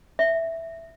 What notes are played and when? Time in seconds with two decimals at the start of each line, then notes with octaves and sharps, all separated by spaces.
0.19 E5